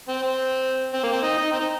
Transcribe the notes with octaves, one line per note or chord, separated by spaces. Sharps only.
C4
C4
C4
A#3
C4
D#4
D#4
C4
D#4